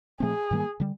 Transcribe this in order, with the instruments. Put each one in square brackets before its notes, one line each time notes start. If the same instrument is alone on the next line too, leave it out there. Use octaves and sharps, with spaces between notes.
[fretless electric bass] A#2 F3 A3 C4 [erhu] G#4
[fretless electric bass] G#2 D#3 G3 A#3
D3 G3